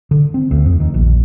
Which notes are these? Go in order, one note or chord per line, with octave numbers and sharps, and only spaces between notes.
D3
C4
D2
F2
D#3
A#1